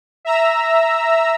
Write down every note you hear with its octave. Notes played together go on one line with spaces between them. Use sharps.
E5 A#5 E6